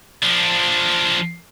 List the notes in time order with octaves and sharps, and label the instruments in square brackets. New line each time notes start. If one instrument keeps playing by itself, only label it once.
[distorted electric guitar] F3 D4